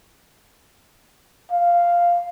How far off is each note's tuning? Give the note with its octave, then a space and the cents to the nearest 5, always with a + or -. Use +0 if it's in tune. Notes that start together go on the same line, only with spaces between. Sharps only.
F5 -5